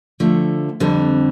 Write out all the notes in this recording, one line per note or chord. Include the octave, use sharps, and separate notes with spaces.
D3 F3 A3
F2 D3 G3 C4